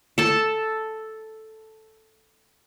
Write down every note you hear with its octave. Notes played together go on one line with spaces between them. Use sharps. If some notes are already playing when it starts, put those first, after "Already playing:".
A4 A5